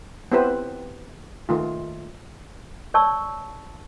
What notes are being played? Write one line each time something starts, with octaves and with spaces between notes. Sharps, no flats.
B3 C4 E4 G4 B4 C5
D#3 A3 F4
C#5 D5 A5 C#6 E6